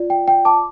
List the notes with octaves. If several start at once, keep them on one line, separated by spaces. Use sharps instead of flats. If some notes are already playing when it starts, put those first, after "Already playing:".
Already playing: F4 D5
G5
G5
A5 D6